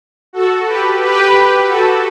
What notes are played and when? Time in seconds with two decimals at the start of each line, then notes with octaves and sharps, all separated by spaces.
0.33 F#4 A4
0.66 G4 B4
1.01 G4 B4
1.66 F#4 A4